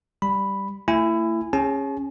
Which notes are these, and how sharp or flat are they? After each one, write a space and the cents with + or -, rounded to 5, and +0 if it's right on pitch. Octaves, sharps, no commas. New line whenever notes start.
G3 +0 B5 +0
A3 +45 E4 +20 G#5 -15
C#4 -15 G#4 -20 A5 -45